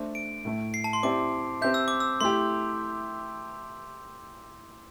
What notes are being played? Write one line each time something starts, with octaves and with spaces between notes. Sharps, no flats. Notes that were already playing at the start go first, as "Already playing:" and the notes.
Already playing: A3 D4 C5
D7
A2 A3 E4
C7
A5
C6
C4 E4 G4 D5 D6
C4 G4 E5 G6
E6
D6
E6
A3 E4 G4 C6